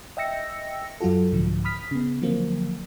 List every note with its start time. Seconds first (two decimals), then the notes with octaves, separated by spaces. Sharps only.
0.17 D#5 E5 G5 E6 A#6 C#7
1.00 F#2 F#3 F4 F#4 A4
1.32 C2 G#2 D3 F3
1.64 B5 D#6 F6 B6
1.91 C#3 B3
2.21 D3 F3 F#3 A#3 C4